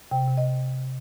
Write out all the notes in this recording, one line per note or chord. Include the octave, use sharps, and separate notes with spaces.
C3 G5
C3
D#5